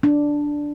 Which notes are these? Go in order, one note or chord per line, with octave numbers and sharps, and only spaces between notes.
D4